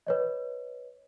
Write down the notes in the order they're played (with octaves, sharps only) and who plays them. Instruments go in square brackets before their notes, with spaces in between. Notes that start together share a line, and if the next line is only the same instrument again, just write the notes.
[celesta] B4 C#5 D#5